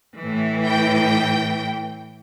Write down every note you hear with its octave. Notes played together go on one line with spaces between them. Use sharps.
A2 E3
G5